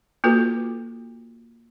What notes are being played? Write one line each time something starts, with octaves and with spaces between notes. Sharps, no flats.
A#3 F4 F#4 A4 B4